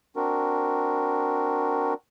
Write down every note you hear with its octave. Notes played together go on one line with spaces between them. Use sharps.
C4 D4 F#4 A#4